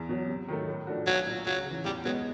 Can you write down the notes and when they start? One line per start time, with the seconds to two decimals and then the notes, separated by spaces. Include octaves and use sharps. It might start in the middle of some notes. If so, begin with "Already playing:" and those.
Already playing: E2
0.09 B2 F#3
0.28 C3
0.48 D#3 F#3 A3
0.68 A2
0.87 F3 A3 D4 F#4
1.07 B1 F#3
1.26 A#2 F#3
1.46 C#2 F#3
1.65 C#3 E3
1.85 E2 G3
2.05 B2 F#3 G#3 B3